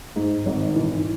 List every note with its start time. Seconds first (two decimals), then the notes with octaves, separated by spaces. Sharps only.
0.16 G#2
0.46 G#1
0.76 E3